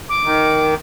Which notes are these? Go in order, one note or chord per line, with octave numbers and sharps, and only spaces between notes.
D6
D#3